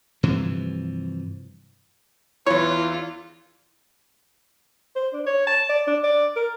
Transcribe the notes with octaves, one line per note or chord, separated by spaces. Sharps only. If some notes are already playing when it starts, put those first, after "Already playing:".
G2 C3 E3 F3
E2 E3 E4 F4 C#5
C5
D4
C#5
A5
D5
D4
D5
A#4